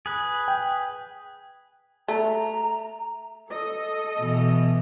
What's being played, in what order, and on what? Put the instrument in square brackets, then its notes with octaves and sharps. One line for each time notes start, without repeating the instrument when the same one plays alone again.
[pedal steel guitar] G#4 B4
[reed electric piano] G5
[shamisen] A3 [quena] A#5
[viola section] A4 D#5
[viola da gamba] B2 E3